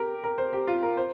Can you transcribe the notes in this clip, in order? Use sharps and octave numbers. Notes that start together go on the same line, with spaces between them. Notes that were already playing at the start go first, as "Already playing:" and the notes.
Already playing: G4 A#4
A#4
C5
G4
F4
A#4
C5